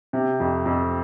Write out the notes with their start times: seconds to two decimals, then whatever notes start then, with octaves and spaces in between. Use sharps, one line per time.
0.13 C3
0.40 F2
0.66 F2